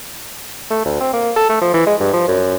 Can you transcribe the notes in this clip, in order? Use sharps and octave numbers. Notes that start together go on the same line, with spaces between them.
A3
D2
C4
A#3
A4
A3
F3
E3
G#3
G2
F3
F#2